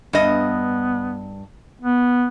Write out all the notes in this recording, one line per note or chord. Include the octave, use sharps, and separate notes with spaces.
G2 B3 D#5
B3